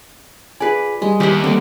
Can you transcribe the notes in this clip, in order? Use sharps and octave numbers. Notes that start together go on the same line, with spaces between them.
F4 G#4 B4 D5 G#5
G3 G#3
D#2 G4 E5 F#5
D3 G3 A#3 C4 A#4